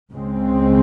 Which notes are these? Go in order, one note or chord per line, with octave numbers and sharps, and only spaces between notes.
C#2 C#3 G#3 C4